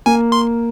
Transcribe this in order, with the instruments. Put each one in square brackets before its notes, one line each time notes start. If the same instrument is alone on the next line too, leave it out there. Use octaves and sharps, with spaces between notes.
[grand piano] A#3 [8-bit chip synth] G#5
[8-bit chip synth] C6